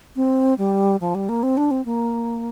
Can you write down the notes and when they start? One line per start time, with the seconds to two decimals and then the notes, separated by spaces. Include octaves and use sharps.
0.16 C4
0.58 G3
1.01 F3
1.15 G3
1.29 A#3
1.43 C4
1.57 D4
1.71 C4
1.85 A#3